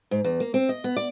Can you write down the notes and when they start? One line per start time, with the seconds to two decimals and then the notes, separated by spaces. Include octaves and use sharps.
0.11 G#2
0.24 E2
0.40 A#3
0.54 C4
0.69 D#5
0.84 B3
0.96 D5